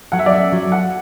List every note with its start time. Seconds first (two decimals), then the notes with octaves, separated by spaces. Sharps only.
0.12 F#3 F#5
0.19 E5
0.26 D5
0.32 C#4 E5
0.52 F#3
0.72 F#4 F#5